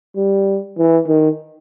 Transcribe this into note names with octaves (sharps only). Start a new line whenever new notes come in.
G3
E3
D#3